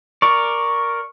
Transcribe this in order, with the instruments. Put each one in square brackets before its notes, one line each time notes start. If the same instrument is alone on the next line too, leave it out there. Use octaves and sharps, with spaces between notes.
[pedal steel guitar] A#4 D5 [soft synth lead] C#6